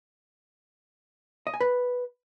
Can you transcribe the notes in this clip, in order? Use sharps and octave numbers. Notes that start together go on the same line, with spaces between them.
D#5
G#5
B4